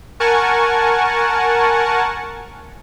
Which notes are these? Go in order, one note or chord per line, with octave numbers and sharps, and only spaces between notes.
A#4 F#5 G#5 A5 C#6